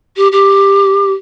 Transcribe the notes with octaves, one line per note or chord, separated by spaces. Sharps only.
G4
G4